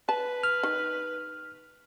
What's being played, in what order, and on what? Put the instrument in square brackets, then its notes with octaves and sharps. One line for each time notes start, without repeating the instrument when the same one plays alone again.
[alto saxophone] B4 [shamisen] A5
[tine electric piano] F6
[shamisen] D#3